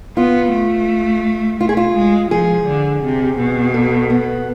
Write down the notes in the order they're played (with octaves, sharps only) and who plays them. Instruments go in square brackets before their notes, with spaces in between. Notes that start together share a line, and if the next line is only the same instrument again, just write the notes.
[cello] B3 [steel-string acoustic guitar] F4
[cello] A3
[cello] A3 [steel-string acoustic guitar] F4
[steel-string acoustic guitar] G#4
F4
[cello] G#3
[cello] F3 [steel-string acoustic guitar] G#4
[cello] D3
C3
B2
[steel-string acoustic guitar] A4
B3